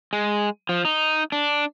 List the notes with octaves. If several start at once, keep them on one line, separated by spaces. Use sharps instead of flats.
G#3
F3
D#4
D4